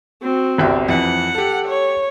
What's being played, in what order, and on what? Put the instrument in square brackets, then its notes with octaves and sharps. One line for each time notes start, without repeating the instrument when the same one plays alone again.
[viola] C4 F#4
[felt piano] G1 C2 G5
[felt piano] F2 E3 [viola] F#5
[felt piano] G4 A4
[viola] C#5